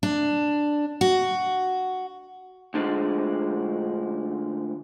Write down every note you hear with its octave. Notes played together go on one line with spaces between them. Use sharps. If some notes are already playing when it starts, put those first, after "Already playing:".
D4
F#4
D2 D3 F3 G#3